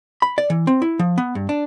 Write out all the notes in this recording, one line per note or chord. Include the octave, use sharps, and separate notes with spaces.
B5
D5
E3
C4
E4
F3
B3
G2
D4